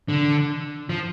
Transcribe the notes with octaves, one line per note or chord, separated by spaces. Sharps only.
D3
F3